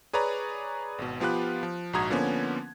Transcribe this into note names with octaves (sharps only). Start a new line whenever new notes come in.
G#4 B4 C#5 D5 A#5
G#1 B2
F3 B3 F4 G4 B4 F#6
F3
A#1 G#2 F#4 A#5 D#6 G#6
D3 F3 A#3 B3 C#4